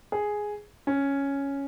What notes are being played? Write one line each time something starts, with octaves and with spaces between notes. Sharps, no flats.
G#4
C#4